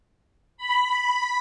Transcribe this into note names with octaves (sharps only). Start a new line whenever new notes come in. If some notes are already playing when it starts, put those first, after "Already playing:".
B5